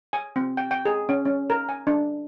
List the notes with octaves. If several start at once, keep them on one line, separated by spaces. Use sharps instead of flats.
G#5
C4
G5
G5
G#4
C#4
C#4
A#4
G#5
D4